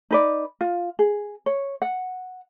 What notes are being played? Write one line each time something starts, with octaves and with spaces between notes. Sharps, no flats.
D#4 B4 D5
F4
G#4
C#5
F#5